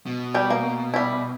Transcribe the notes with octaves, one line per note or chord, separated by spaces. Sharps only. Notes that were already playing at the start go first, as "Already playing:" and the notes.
B2
G3 G5
A#3
G3 E4